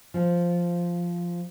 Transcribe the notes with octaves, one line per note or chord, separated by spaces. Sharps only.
F3